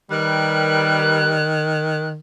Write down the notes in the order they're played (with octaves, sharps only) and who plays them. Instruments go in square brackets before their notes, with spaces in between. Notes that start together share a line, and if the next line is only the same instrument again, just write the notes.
[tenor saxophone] D#3 [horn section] G3 A#4 B4 [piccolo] F#6